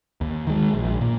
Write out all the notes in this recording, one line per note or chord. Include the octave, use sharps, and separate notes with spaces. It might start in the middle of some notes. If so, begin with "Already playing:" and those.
D#2
D#3 G#3
A#1
A#2